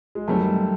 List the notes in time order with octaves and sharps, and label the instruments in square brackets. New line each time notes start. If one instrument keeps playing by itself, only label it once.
[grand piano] G#3
[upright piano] F#2 D#3 G3 C4 [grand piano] A3